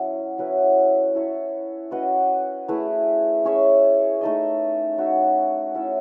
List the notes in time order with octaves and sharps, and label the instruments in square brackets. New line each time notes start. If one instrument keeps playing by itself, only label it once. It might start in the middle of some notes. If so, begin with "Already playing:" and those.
Already playing: [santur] F#3 C#4 E4
F#3 C#4 E4 B4
E4 A4 C#5
C#4 F#4 B4 D#5
A3 E4 G#4 B4
C#4 G#4 C#5 E5
A3 D#4 A4 D#5
D#4 F#4 C#5 E5
C#4 E4 A4 E5